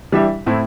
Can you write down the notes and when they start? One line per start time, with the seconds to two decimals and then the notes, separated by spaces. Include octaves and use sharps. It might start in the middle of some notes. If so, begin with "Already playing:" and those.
0.12 E3 G3 D4 G4 E5
0.46 A2 A3 C4 E4